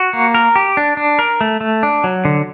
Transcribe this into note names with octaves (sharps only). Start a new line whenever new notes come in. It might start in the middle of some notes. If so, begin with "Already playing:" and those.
Already playing: F#4
A#3
A#4
G4
D4
D4
A#4
A3
A3
D4
F#3
D3